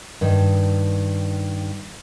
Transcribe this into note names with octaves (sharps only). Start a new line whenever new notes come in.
G2 D#3